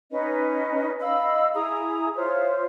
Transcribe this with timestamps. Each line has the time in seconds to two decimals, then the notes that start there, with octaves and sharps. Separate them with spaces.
0.12 C#4 D#4 B4 D#5
1.01 D#5 F5 B5 E6
1.54 E4 G#4 A#5 D#6
2.15 F4 C5 C#5 E5